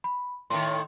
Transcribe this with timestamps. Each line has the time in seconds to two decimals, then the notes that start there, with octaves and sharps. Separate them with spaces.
0.04 B5
0.50 A2 D#3 C6